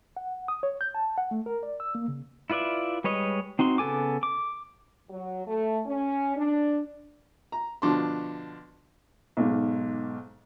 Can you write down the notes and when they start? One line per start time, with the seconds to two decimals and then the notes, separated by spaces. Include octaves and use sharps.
0.17 F#5
0.48 D#6
0.63 C#5
0.81 G6
0.95 A5
1.18 F#5
1.31 A3
1.46 A#4
1.63 D5
1.80 E6
1.95 A#3
2.08 C#3
2.50 E4 F4 B4 D5 E5
3.04 G3 G#3 B4 C#5 D#5
3.59 C4 D#4 F#4 C6
3.78 C#3 B3 A4 G#5 D6
4.23 D6
5.10 F#3
5.46 A3
5.86 C#4
6.37 D4
7.52 A#5
7.82 B2 D3 F3 D4 C6
9.37 B1 G#2